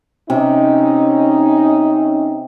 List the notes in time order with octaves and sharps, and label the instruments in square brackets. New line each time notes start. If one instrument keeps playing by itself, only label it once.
[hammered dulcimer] C3 [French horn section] C#4 D#4